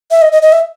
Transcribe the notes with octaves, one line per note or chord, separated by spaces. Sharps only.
E5
D#5
D#5
D#5
E5